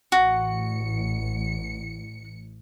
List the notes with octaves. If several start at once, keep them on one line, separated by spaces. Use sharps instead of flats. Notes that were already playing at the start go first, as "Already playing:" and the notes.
A1 F#4 C#7